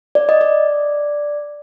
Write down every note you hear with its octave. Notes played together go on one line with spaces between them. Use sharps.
D5
D#5
D5